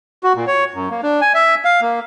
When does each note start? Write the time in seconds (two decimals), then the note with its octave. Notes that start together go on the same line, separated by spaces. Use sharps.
0.23 F#4
0.36 A#2
0.47 C#5
0.74 F#2
0.90 A#3
1.03 D4
1.21 G#5
1.34 E5
1.64 F5
1.81 A#3